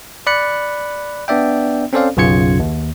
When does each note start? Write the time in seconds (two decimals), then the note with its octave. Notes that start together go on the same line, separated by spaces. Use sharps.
0.27 D5 B5 F#6 C#7
1.28 B3 D4 D5 E5 G5
1.93 C4 C#4 A4 C5 D5 F5
2.17 B1 F#2 C#3 F4 G#6 C#7
2.59 D#2